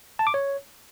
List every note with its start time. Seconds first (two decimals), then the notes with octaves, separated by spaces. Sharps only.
0.19 A5
0.27 D6
0.34 C#5